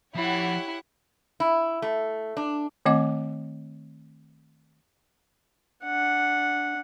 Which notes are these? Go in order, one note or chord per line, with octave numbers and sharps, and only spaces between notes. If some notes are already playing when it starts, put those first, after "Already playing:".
F3 E4 G4 C#5 F#5 B5
E4
A3
D4
D#3 A3 C4 D#5 F#5 D6
D4 F#5